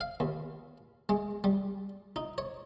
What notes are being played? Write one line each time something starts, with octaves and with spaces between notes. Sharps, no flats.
F5
D#2
G#3
G3
D#4
C#5